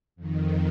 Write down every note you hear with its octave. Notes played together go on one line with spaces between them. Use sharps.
F2 D#3